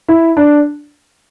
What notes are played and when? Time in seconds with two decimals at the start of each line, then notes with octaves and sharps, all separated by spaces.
0.08 E4
0.37 D4